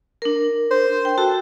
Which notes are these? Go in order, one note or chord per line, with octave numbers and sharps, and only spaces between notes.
D4 A#4
C5
G5
F#4 A4